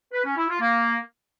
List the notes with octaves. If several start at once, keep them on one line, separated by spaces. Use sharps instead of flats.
B4
C#4
E4
F4
A#3